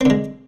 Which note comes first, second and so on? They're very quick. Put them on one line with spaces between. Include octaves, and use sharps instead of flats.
C4 D3 G#3